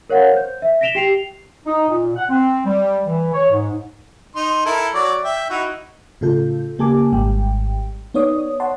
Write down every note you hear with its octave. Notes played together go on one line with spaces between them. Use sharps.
A#4 C#5 F5 F#5
C5 G6
E5
A#6 B6 D7 E7 F7 G7
G4 G5 C7 F7
D#4
A#2
F#5
C4
G3
E3
C#5
G#2
D#4 C6
E4 A4 A#4
F#3 C#5 D5
E5 G5
D#4 E4 F#4
A2 C#3 F4 A4 G6
C#3 A#3 G4 G#5 A5 D6
G#1 G#2 G3 G5
B3 D#4 C#5 D5 D#6
C#5 F#5 A5 C6